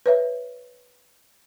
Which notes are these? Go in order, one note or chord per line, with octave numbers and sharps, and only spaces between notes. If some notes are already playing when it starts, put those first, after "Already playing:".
B4 C#5 E5